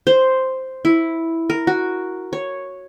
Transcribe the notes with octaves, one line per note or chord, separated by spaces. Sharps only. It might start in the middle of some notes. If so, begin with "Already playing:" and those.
C5
E4
A#4
F#4
C#5